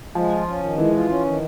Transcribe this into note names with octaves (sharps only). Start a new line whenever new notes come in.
F3 G#3
F4
C#4
D#3
E3 G#3
F4
C#4
D#3